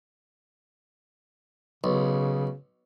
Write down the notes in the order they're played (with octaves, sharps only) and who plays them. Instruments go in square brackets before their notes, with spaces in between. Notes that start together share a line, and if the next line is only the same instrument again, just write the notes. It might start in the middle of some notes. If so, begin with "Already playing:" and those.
[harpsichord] B1 [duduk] C#3